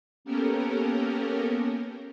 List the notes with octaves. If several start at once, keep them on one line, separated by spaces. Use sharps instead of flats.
A#3 B3 C#4 G4 A4 A#4